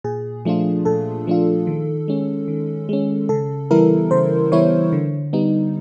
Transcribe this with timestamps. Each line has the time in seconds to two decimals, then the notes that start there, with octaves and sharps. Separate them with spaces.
0.04 A#2 G#4
0.45 F3 A3 D4 F4
0.85 A#2 A4
1.27 F3 A3 D4 F4
1.67 D#3
2.08 G#3 C#4
2.48 D#3
2.89 G#3 C#4
3.29 C#3 A4
3.71 E3 G3 B3 E4 A#4
4.11 C#3 C5
4.52 E3 G3 B3 E4 C#5
4.92 D3
5.33 G3 B3 D#4